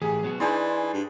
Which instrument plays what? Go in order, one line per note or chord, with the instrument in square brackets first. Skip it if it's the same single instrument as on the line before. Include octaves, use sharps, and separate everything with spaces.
[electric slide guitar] A2 E3 G4 [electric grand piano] G#4 G#5
[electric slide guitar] F#3 B3 F#4
[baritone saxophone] E3 [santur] D4 G#4 C5 [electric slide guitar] D#4 [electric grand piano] G#5 A5 C6
[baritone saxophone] G2